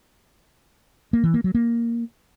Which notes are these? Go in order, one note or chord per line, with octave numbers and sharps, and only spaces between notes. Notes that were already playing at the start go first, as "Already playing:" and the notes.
A#3
E3
A#3
F#3
A#3